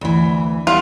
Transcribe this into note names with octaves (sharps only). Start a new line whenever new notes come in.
D2 E3
G3 B3 E4 F4